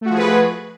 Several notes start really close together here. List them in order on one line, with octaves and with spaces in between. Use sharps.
A3 F#4 F3 G#4 B4